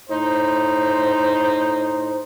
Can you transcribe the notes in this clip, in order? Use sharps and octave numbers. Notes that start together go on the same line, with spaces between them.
A2 D#4 C5